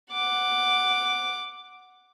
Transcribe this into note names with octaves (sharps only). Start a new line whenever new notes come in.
F#5 D6